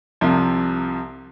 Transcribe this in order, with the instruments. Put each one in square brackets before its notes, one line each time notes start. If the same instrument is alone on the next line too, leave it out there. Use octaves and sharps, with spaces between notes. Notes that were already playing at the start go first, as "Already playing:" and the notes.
[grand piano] C2 C3 F3